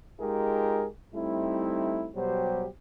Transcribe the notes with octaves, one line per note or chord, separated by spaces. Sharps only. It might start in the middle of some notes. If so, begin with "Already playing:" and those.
G#3 D#4 F4 G4 G#4 A#4
G3 A3 C4 D#4 E4
B2 F#3 G3 G4 C5